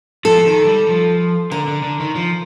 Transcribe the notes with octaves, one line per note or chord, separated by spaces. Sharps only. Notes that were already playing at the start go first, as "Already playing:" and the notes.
F3 A4
D#3
G3
F3
D3 A#4
D3
D3
D#3
F3